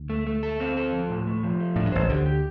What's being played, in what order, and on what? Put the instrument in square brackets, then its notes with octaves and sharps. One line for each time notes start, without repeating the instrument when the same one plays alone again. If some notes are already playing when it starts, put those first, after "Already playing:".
Already playing: [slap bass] D2
[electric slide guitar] A3
A3
A4
C4
A4
F3
A2
A3
F3
A3
[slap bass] A2 [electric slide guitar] D4
[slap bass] G2
[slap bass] A1 A2 [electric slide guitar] C5
[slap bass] D2 D3 [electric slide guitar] G4
[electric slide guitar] G4